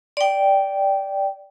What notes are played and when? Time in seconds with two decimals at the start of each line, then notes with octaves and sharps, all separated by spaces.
0.17 D5 G5